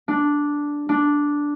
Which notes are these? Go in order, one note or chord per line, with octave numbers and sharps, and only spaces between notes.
D4
D4